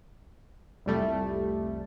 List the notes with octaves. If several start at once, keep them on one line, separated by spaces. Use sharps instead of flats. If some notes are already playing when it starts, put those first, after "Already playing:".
C2 F2 G3 A3